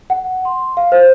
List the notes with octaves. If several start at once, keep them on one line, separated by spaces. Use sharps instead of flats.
F#5
C6
F5
C5